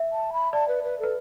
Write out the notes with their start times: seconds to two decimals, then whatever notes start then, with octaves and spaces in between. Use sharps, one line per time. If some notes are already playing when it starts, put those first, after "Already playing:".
Already playing: E5
0.12 A5
0.33 B5
0.53 D5 A5
0.68 B4
0.84 B4
0.99 A4 B4